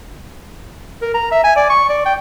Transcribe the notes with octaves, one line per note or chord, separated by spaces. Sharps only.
A#4
A#5
E5
G#5
D5
C#6
D5
G5